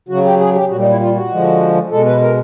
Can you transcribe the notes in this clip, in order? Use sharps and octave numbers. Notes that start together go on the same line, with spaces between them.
C#3 F#3 F#4
G4
G#4
G4
A#2 G3 F#4
D#4
E4
F4
F#4
D3 F3 G#3
B2 G#3 A4
B4
A#4